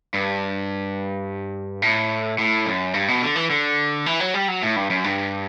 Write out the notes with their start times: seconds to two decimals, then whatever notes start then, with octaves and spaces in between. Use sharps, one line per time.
0.14 G2
1.82 A2
2.38 A2
2.66 F#2
2.94 G2
3.08 B2
3.22 D3
3.36 E3
3.50 D3
4.06 E3
4.20 F#3
4.34 G3
4.48 F#3
4.63 A2
4.76 G2
4.90 F#2
5.04 G2